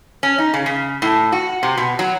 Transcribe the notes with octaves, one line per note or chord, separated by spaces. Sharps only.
C#4
D#4
C#3
C#3
A2
F#4
C3
B2
F#3